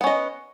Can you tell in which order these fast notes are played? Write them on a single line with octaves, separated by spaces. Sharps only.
B3 C#4 D#5